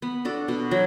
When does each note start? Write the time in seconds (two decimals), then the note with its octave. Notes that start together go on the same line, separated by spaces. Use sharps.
0.02 B3
0.25 D4 F#4 A4
0.48 B2
0.71 F#3